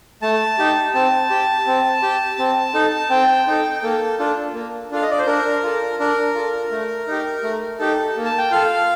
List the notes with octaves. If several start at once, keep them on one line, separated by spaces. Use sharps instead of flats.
A3 A5
D#4 G4
C4 A5
G4
C4
G4
C4
D#4 A4
C4 G5
D#4 A4
A#3 A4
D4 F4 A4
A#3
D4 F4 A4 F5
D#5
D5
C5
D4 A#4
F4 A4
D4 A#4
F4 A4
A3
D#4 G4
A3
D#4 G4 A4
A#3
A5
G5
F4 A4 F5